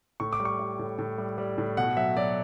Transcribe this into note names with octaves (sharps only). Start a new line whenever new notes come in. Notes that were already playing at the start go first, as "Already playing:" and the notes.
A2 C#6
D6
G3
C#6
G3
A2
A2
G3
G3
A2
B2 F#5
F#3 E5
F#3 D5